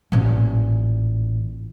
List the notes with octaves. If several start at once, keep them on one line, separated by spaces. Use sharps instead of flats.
A1 A#2